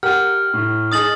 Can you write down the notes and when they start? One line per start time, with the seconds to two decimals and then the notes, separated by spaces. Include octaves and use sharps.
0.03 G4 A#4 F#5 F6
0.54 A2
0.92 D#4 G#4 D#6 A6 F#7